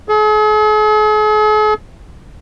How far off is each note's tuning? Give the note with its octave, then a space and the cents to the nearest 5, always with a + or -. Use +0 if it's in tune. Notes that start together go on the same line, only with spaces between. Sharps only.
G#4 +45